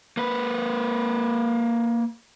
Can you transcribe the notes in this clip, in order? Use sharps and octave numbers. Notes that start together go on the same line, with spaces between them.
A#3 B4